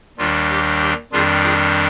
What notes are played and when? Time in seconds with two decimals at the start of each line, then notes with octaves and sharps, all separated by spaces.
0.18 D#2 D#3 G3 D4 F4
0.50 G4
0.81 G4
1.12 F2 D#3 G3 D4 F4 G#4
1.44 F4 G#4